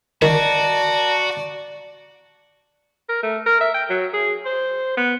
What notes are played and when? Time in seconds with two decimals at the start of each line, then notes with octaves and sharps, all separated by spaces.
0.22 D#3 F#4 D5 A5 A#5
3.09 A#4
3.23 A3
3.47 A#4
3.61 E5
3.74 G5
3.90 F#3
4.14 G#4
4.45 C5
4.97 B3